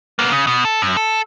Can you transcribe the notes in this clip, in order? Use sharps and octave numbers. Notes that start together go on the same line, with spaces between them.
A#3 B3
C#3
B2
A4
F#2
A4